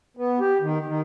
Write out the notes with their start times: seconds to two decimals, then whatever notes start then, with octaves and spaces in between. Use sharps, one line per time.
0.17 B3
0.40 G4
0.61 D#3
0.86 D#3